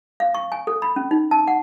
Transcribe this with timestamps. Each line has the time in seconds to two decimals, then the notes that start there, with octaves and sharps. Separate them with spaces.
0.20 F5
0.35 C#6
0.52 G#5
0.67 A4
0.82 B5
0.96 C#4
1.11 D#4
1.31 A5
1.48 F#5